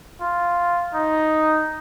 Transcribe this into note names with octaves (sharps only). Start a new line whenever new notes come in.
F4
D#4